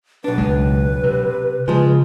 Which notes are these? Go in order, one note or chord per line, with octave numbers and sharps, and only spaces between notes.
B1 D4 B4
C#2 G#3
C3
C#3 F3 G#3